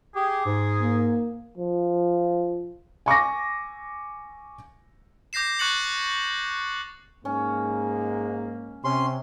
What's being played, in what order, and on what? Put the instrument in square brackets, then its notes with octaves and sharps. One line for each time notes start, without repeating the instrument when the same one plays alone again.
[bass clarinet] G4 [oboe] G#4
[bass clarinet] G#2
[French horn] A#3
[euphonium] F3
[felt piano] G#5 C#6 D6 A#6
[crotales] D6 G6 A#6 C7 E7
C#6 F#6 A6 C#7 F#7
[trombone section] G#2 G#3 A#3 [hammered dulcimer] C#4
[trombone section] C3 [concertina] C#4 C6